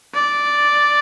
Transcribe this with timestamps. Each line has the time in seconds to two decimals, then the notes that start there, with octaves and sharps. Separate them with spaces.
0.15 D5